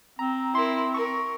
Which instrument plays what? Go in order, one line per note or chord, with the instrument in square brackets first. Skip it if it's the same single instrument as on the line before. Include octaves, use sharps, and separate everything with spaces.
[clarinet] C4 [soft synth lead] A#5
[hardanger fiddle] E4 A#4 [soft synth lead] C6
[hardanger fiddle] A#4 [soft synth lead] C#6